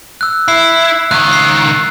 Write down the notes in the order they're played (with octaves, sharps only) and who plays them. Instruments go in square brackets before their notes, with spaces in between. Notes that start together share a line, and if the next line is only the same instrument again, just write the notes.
[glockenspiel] E6 F#6
[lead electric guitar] E4 [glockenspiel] C7
[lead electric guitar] C#2 D#3 [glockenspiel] F#6
[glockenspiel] C7